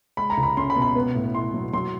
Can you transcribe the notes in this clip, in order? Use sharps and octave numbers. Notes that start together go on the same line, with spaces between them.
G#3 B5
A#5
C#2
B5
C#4 C6
B5
B2
B5
B3
A2
E4 C6
F#3
F#3 C6